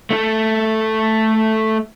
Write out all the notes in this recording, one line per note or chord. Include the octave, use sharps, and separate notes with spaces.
A3 A4